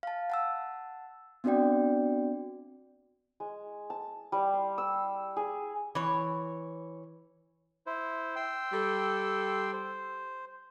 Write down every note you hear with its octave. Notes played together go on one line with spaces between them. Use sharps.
F5 A5
F#5 A5 E6
B3 C4 D4 F#4 D5 G5
G#3
A5
G3
C6
E6
G#4
E3 C#5
E4 C5
G5 C6 E6
G3 A4
C5